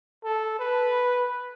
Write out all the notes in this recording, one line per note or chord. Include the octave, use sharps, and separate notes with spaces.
A4
B4